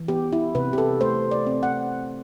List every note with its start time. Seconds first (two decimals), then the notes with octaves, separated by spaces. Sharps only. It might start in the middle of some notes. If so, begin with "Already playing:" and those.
Already playing: E3
0.08 B3 G4
0.33 E4
0.55 C3 B4
0.73 G4
0.78 A4
1.00 A3 C5
1.31 D5
1.47 C4
1.63 F#5